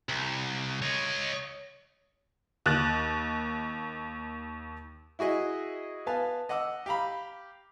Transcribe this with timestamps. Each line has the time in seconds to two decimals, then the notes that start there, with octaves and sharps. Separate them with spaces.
0.09 C2
0.82 C#5 D#5
2.66 D#2 F#6 A6
5.19 E4 F#4 G#4 D#5 E5
6.07 B3 B4 F5 G#5 A5
6.49 D#5 F#5 D6 E6
6.86 G4 F5 A#5 B5